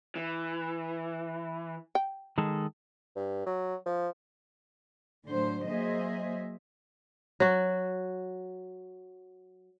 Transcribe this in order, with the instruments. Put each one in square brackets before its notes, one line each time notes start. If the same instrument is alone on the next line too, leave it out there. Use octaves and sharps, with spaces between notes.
[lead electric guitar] E3
[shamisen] G5
[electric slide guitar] D#3 G#3 A4
[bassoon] G2
F#3
F3
[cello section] A2 D3 F#3 A3 C5
F#3 A#3 G#4 C5 D#5 E5
[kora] F#3 F#4